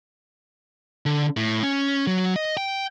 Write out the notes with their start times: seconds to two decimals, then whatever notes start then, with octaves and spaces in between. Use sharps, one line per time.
1.06 D3
1.37 A2
1.63 C#4
2.07 F#3
2.36 D#5
2.57 G5